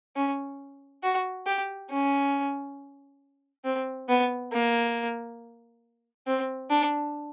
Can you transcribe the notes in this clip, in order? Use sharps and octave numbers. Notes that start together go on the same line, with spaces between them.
C#4
F#4
G4
C#4
C4
B3
A#3
C4
D4